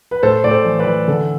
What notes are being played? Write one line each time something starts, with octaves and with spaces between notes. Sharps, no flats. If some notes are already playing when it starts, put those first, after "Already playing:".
B4
A2 A4 C5
A2 D5
A4 C5
E3
B4 D5
E3
D3 A4